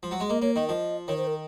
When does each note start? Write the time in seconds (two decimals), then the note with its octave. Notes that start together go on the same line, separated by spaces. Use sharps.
0.03 F3
0.11 F#3
0.20 G#3
0.29 A#3 D#5
0.42 A#3 C#5
0.56 D#3 D#5
0.69 F3 D#5
1.08 D#3 C#5
1.17 C5
1.27 A#4